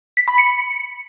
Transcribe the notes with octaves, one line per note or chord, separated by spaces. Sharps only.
B6
B5
C#7